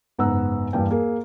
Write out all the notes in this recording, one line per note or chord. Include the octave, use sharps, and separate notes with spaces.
F#1 G#2 B3 F#5 A#5 E6
E2 G2 E3 A#3 G5
A#3 G#4 A#4